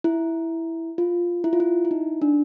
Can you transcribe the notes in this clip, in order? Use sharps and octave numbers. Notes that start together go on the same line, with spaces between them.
E4
F4
E4
F4
E4
E4
D#4
D4